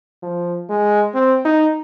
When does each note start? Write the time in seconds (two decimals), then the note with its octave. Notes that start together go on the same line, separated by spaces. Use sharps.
0.23 F3
0.69 G#3
1.14 C4
1.45 D#4